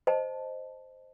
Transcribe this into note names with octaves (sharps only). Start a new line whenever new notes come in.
C5 D#5 A5